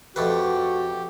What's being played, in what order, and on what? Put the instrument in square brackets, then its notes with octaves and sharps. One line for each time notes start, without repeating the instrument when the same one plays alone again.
[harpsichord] F2 A3 B4 [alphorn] F#4 [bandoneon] G4